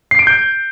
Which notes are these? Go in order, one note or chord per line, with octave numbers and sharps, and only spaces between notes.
C7
D7
G6